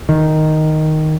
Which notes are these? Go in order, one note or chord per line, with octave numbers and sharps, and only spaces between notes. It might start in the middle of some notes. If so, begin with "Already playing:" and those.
D#3